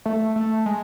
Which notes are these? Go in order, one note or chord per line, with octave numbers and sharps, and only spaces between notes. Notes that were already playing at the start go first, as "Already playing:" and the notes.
A3
A3
G#3